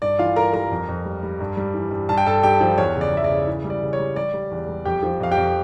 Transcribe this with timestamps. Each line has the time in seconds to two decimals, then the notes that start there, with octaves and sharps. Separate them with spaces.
0.02 G2 D5
0.19 E3 F4 F5
0.36 G2 A#4 A#5
0.53 G3 A#4 A#5
0.71 F2
0.88 F2
1.05 G3
1.23 G3
1.40 G2
1.57 G3
1.74 E3
1.91 G2
2.09 G2 A5
2.17 G5
2.26 G2 A4 A5
2.43 G2 G4 G5
2.61 F3
2.78 E2 C#5
2.95 C#3
3.01 D5
3.13 E2 E5
3.24 D5
3.30 C#3
3.47 E3
3.64 G3
3.70 D5
3.82 C#3
3.93 C#5
3.99 G3
4.16 G3 D5
4.34 G3
4.51 E2
4.69 G3
4.85 F2 G4 G5
5.03 F3
5.20 F2 F5
5.32 G4 G5
5.37 F2